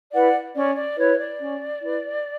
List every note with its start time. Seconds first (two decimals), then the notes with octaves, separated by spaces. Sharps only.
0.13 E4 B4 D5 F#5
0.55 C#4 D5
0.76 D5
0.97 E4 B4 C#5
1.19 D5
1.40 C#4
1.82 E4 B4